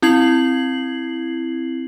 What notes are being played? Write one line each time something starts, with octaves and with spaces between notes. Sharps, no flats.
C4 E4 G#6 C7 F#7